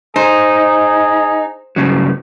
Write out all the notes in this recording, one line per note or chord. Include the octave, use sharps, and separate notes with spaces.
D#4 G#4 C5
G2 C#3 F#3